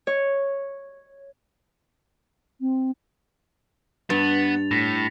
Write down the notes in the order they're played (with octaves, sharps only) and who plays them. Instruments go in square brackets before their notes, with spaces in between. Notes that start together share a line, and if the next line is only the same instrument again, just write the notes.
[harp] C#5
[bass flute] C4
[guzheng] G2 [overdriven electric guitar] B3 [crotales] A6 F7
[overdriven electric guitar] A2 [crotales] A#6 B6 C#7